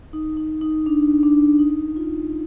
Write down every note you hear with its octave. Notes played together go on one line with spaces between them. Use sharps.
D#4
D#4
D#4
D4
D4
D#4
F4